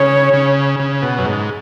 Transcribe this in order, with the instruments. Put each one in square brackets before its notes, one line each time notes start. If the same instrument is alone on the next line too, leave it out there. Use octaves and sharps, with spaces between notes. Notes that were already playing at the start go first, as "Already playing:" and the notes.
Already playing: [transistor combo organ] C#3 [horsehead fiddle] C#5
[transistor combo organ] C#3
C#3
B2
F#2
G#2